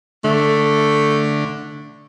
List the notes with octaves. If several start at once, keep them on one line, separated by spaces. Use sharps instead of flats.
D3 A3